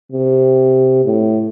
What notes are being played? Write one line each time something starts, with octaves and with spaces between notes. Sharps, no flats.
C3
A2